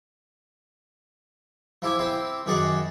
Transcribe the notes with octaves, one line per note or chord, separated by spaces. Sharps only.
F3 E4 G4 G#5
C4 E4 G4
F#2 D#3 G#4 D5 F#5